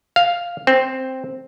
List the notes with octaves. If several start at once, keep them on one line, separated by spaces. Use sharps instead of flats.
F5
C4